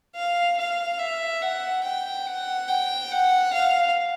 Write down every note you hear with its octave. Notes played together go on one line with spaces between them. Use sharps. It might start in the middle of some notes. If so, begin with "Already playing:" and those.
F5
F5
E5
F#5
G5
F#5
G5
F#5
F5